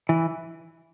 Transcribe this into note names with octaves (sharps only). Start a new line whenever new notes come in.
E3